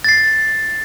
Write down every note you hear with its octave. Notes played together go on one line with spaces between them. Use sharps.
A6 C7